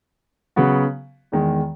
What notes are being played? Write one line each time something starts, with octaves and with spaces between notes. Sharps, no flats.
C#3 F#3 B3 F#4
E2 D#3 G#3